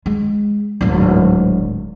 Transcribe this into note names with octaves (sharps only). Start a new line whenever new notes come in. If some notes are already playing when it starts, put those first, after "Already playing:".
G#3
D1 G#1